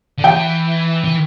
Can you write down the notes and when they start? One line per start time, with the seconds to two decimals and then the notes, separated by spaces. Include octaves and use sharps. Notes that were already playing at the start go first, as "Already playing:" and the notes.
0.18 D3
0.24 E3 G5
1.04 E3